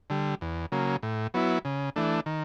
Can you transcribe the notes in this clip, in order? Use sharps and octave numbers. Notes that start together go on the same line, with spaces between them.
D3 G3
E2
C#3 F#3 A#3
A2
F#3 B3 E4
C#3
E3 A3 D4
D#3